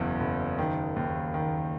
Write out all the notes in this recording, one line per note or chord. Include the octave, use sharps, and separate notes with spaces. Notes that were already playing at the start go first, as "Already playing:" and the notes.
Already playing: F#1 E2 B2
F#1
D#3
D#2
D#3